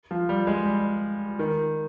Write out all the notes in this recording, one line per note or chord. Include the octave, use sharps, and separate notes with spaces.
F3
G3
G#3
G3
D#3